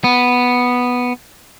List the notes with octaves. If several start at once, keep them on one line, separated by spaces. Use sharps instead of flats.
B3